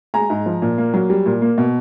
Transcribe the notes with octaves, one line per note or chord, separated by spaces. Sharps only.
G#3 G#5 A#5
G#2
F3
A#2
A#3
F#3
G3
A#2
A#3
B2